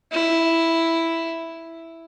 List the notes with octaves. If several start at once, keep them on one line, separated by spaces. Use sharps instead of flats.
E4